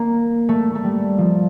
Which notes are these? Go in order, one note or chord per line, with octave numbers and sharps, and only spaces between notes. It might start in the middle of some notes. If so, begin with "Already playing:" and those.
Already playing: A#3
A3
A3
G3
F3